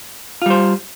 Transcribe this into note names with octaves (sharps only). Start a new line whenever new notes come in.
G3 F4 C5